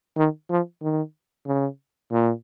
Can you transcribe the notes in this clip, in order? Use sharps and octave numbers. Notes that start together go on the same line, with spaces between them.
D#3
F3
D#3
C#3
A#2